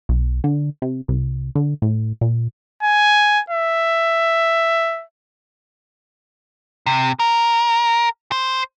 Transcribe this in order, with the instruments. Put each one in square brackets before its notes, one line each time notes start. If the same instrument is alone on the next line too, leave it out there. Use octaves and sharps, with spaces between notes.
[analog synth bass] B1
D3
C3
C2
D3
A2
A#2
[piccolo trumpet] G#5
E5
[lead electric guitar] C3
A#4
C5